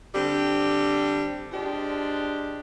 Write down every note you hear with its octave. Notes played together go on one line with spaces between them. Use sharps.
D3 G3 C4 G4
F3 G#3 D4 G4